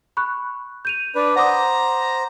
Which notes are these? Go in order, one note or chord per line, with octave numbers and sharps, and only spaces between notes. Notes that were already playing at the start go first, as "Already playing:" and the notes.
B5 C#6 F#6
G6 D#7 F7
D4 B4
C5 F#5 A#5 D6 D#6